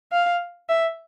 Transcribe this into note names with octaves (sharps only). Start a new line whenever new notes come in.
F5
E5